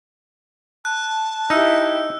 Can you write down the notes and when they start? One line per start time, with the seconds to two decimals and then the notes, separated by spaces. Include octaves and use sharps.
0.85 A5 F#6
1.50 D#4 E4 G4 E6 C#7